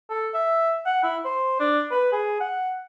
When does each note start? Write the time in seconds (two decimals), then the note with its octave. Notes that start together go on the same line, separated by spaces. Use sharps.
0.10 A4
0.34 E5
0.86 F#5
1.03 E4
1.25 C5
1.60 D4
1.91 B4
2.12 G#4
2.40 F#5